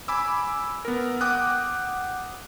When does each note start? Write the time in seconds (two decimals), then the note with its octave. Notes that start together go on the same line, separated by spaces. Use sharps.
0.08 G#5 B5 D6 E6
0.85 B3 A#4
1.21 F#5 G5 D6 D#6 F#6